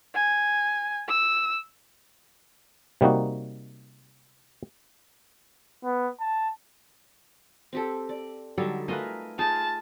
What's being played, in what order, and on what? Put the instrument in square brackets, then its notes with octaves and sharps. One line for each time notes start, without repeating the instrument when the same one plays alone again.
[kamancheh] G#5
E6
[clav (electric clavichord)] C3 G3 A#3 D#4 F#4
[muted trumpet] B3
A5
[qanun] C4 G4 A4
D5
[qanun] D3 D#4 E5 [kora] F#3 G3 A4
[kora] A3 F4 B4 [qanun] A#4 D#5 G#5
[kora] D#4 [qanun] F4 G#4 [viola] A5